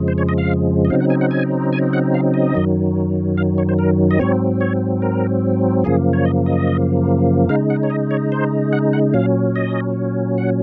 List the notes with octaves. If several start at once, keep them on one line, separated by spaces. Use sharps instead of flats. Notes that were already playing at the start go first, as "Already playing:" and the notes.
Already playing: F2 C#3 F3 G#3
C5
C#5
D#5
F5
D#5
C#3 F#3 C4 D#4 F5
F#5
G#5
F#5
G#5
G#5
F#5
F5
D#5
F#2 D#3 F#3
F5
C#5
C5
A#4
D#5
G#2 F#3 C4 C#5
C#5
A#4
F#2 C#3 F3 A#3 G#4
C#5
D#5
D#5
C#3 G#3 D#4 F5
F#5
C#5
D#5
C#5
C5
F#5
F#5
A#2 F#3 C#4 F5
D#5
F#5